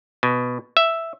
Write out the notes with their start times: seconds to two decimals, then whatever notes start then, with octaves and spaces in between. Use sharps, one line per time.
0.23 B2
0.77 E5